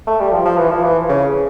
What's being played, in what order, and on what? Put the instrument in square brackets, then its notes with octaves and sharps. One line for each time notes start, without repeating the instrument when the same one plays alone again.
[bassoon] A3
G3
F3
F3
E3
F3
E3
C#3